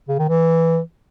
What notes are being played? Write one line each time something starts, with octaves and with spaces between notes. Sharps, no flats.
C#3
D#3
E3